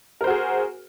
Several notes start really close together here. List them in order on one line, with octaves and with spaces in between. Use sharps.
A#4 C5 F#4 G#4